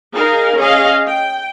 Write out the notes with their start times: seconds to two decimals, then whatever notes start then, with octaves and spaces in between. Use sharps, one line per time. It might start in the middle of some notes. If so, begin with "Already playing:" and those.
0.14 D#4 G#4 A#4 F5
0.57 C#4 G#4 D#5 F5
1.06 G5